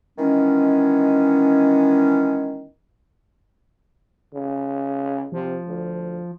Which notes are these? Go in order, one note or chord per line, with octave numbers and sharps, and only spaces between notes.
D#3 E3 G#3 B3 C#4
C#3
C3 F3
D2